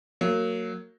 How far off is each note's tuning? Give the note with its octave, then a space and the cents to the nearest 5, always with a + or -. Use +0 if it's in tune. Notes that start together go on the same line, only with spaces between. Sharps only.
F#3 +0 A#3 -20